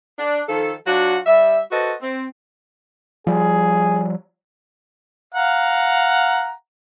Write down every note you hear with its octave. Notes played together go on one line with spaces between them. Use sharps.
D4
D#3 F3 A4
F#3 D4 F4 F#4
G3 E5
F#4 A4 B4 C5 D#5
C4
F3 G3 G#4
F5 F#5 A#5